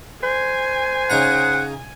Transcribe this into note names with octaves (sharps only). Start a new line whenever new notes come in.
C5 G#5
C#3 D#4 F#5 A#5